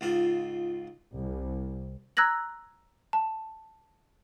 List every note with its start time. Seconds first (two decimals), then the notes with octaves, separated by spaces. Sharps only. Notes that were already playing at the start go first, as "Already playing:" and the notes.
0.01 C#2 G#2 F4
1.15 C2
2.17 A#5 E6 F#6 G#6 A#6 F#7
3.13 A5